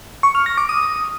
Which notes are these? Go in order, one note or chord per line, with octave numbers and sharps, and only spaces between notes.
C#6
F6
A#6
D6
D#6